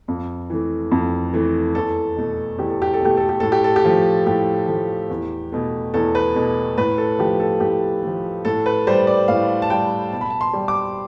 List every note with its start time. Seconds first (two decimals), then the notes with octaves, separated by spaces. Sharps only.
0.08 F2
0.50 E3 A3
0.91 F2
1.34 E3 A3
1.75 E2 A4
2.17 B2 A3
2.58 E2 G4
2.70 A4
2.82 G4
2.94 A4
3.00 B2 A3 G4
3.17 A4
3.29 G4
3.40 A2 A4
3.52 G4
3.64 A4
3.76 G4
3.85 F3 A3
4.26 A2 G4
4.68 F3 A3
5.10 E2
5.52 B2 A3
5.94 E2 A4
6.15 B4
6.35 B2 A3
6.78 A2 B4
6.98 A4
7.19 F3 A3 G4
7.40 A4
7.60 A2 G4
8.03 F3 A3
8.45 A2 A4
8.66 B4
8.87 G3 C5
9.07 D5
9.28 A2 F5
9.62 A5
9.70 G3 G5
10.12 B2 A5
10.21 B5
10.30 A5
10.41 C6
10.53 G3
10.68 D6